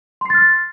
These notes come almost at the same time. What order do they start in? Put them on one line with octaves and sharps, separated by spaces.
C6 C7 A6 F6